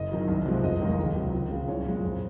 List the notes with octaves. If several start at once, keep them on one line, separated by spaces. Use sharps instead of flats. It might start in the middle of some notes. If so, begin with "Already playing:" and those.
Already playing: F#1 D#5
F#2 D#3 F#3
C2
C3 F3 G#3
F1 D#5
D#2 D#3 G#3
C#2
C3 F#3
C#2
C#3 F3 G#3
C2 C#5
A#2 G#3
F2